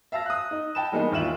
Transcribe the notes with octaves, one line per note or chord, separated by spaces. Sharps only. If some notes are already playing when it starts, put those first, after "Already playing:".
E5 F5 A5 E6 A#6
D#6 F#6
D#4
G5 A5 B5 E7
E3 G3 G#3 A#3 B3 D#4
D#2 E3 F4 E5 E7 F#7